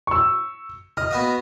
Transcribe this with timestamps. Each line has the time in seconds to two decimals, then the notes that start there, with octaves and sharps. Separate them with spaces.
0.07 C#6 E6
0.97 D#5 F6
1.11 B3 F#4 D#5